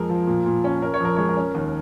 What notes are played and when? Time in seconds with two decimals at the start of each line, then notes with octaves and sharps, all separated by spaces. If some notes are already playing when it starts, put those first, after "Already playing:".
Already playing: F2 G#3 A#4
0.10 F3
0.27 A#2
0.46 A#2
0.64 C#4
0.82 C#4 A#4
0.94 C#5
1.00 F2 A#4
1.17 G#3 C#5
1.29 A#4
1.37 C#4
1.55 D#2